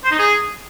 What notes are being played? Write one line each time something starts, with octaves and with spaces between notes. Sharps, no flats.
C5
D#4
G#4